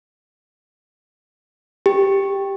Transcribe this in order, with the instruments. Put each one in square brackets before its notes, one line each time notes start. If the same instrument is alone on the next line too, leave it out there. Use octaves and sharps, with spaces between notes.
[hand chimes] G4